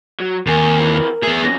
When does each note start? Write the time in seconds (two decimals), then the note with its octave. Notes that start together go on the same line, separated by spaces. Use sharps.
0.20 F#3
0.47 D#2 C3 A#4 G#5
0.79 E3 C4
1.23 A3 B3 G#4
1.43 F2 C#4 A#6